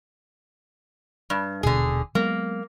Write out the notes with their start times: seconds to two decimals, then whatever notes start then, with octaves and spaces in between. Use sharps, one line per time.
1.30 G2
1.63 D#1 B2 D3 G#4
2.15 F#3 G#3 A#3 B3